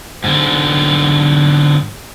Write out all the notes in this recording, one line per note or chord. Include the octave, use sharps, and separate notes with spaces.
G#2 D3